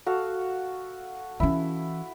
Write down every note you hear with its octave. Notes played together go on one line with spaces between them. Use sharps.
F#4 A4 F5
E3 C#4 E4